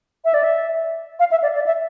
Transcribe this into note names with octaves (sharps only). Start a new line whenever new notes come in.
E5
D5
E5
F5
E5
D5
D5
E5